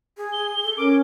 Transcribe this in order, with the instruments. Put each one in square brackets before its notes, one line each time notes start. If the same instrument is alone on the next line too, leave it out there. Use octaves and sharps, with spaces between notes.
[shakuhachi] G#4
[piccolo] G7
[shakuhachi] A4
[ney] C#4 [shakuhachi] A#4 [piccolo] D6